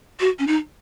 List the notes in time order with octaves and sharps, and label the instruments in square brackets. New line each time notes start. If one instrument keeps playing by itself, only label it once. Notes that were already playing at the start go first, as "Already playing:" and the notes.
[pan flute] F#4
C#4
D#4